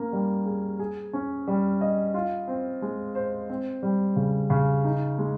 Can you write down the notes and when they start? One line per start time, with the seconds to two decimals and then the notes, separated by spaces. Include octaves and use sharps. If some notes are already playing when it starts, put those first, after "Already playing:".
Already playing: A#3 C#4
0.13 G3
0.46 G#4
0.79 G#4
1.13 C#4
1.48 G3
1.81 D#5
2.14 F4
2.48 C4
2.82 G#3
3.15 C5
3.49 C4
3.83 G3
4.16 C#3
4.50 C#3
4.84 D#4
5.18 G#3